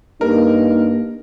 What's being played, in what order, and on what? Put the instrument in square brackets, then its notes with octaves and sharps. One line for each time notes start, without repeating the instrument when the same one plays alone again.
[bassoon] G2 [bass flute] A#3 [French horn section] D#4 [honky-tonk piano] A#4